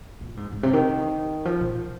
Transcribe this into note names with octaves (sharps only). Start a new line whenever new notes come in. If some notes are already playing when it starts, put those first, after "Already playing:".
A#2
G#2
G#2
C3
D#3
F3
A#2